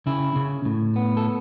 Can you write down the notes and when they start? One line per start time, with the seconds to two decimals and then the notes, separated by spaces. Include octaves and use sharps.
0.07 C#3 E4
0.36 C#3
0.65 A2
0.96 B3
1.17 A4